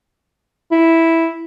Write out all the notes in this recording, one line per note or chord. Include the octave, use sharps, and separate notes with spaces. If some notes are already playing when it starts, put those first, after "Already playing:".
E4